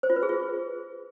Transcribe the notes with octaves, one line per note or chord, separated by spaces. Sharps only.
C5
F4
B4
G#4
F4